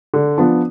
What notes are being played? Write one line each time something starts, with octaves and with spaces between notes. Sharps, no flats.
D3
F3 B3 D4